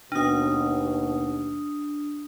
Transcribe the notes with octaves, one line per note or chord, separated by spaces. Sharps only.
D#2 B2 D4 D#6